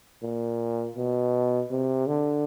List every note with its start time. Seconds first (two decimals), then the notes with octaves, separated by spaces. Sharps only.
0.23 A#2
0.97 B2
1.71 C3
2.07 D3